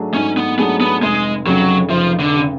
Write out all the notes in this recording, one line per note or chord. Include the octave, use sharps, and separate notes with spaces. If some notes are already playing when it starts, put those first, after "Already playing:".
Already playing: G#2 F#3 A3 D4 G#4
G#2 C#4
B3
F#3 A3 B3 D4 G#4
B3
F1 G#3
F2 C#3 F#3
F1 F3
D3
C#3